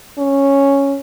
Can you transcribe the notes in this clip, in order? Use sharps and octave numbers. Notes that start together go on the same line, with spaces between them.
C#4